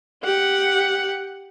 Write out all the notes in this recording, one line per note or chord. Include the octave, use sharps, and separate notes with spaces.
G4 F#5